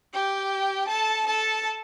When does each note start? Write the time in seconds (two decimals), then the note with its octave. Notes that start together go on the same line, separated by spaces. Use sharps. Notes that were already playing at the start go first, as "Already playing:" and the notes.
0.13 G4 G5
0.89 A4 A5
1.27 A4 A5